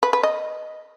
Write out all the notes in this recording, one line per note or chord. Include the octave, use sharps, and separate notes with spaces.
B4
B4
D#5